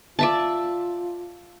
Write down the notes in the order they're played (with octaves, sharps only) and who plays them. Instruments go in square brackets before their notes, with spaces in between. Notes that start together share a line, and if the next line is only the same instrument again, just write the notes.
[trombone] F4 [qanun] D5 E5 A5